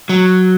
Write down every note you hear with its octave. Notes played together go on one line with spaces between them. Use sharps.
F#3